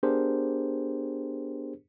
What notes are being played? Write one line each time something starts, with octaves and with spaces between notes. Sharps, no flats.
B3 D4 G4 G#4 A#4 C5